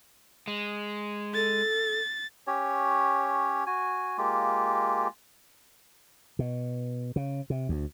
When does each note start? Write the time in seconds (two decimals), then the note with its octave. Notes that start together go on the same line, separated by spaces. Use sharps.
0.47 G#3
1.34 A4 A6
2.47 C#4 G4 C#5
3.66 F#4 G#5
4.18 G#3 A#3 F4 G4
6.39 B2
7.16 C#3
7.50 C3
7.69 D2